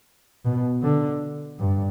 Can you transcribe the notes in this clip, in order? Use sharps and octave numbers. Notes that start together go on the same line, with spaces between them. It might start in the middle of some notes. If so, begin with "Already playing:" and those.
B2
D3
G2